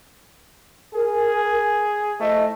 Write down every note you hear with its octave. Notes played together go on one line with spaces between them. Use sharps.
G#4 A#4 G#5
A3 E4 C5 D#5